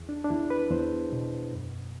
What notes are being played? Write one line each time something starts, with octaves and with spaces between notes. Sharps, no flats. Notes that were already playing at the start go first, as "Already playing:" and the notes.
Already playing: E2
D4
D4
E2 E4
B4
E2 C5
B2
F#2